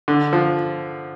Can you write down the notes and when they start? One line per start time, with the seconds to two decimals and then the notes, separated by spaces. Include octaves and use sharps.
0.08 D3
0.33 F3